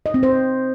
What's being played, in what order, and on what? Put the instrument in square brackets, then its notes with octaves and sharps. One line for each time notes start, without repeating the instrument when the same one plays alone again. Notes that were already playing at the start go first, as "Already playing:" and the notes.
[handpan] D#5
C4
C5